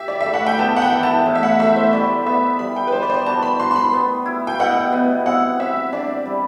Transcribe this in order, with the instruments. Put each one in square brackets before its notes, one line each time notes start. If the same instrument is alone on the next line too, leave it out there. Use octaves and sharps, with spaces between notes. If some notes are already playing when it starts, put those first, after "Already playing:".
Already playing: [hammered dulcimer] G4 [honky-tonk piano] E5
[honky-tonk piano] D5
E5
[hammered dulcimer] A3
[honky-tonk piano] F#5
G5
[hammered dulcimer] B3 [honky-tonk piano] A5
[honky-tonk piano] F#5
G5
[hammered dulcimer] E3
[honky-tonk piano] A5
[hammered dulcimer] A2
[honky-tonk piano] E5
F#5
[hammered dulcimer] A3 [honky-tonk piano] E5
[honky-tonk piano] C5
[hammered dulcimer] G3 [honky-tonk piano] D5
[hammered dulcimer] B3 [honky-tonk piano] E5
[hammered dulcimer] G3 [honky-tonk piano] B5
[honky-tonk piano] G5
B4
[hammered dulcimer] G3 [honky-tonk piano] C5
[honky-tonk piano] D5
C5
[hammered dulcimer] F#4 [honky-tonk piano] A5
[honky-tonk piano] B5
[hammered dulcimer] F#4 [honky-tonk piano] C6
[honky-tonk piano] C6
B5
[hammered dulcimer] B3
E4
[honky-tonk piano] G5
[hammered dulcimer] B2 [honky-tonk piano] F#5
[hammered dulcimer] B3
[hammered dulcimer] C4 [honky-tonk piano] F#5
[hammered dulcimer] C4 [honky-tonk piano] E5
[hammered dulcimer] D4 [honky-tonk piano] D5
[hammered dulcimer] G3